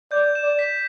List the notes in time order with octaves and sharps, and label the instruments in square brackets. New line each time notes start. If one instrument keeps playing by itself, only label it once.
[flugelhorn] D5 [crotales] G6
[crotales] E7
[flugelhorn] D5
[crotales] B6